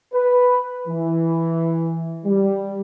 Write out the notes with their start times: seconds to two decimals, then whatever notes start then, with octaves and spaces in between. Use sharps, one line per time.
0.14 B4
0.88 E3
2.25 G3